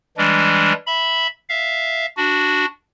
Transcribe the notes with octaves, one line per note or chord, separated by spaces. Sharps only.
E3 G3 G#3 D4
E5 B5
E5 F5
D4 F#4